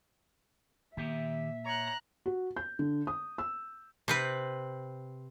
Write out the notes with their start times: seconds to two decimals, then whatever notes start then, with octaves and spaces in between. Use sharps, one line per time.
0.97 A#2 D#3 G4 E5 G5
1.66 C#5 A#5 F#6
2.26 F#4
2.57 G6
2.79 D3
3.07 D#6
3.38 E6
4.08 C3 C4 B4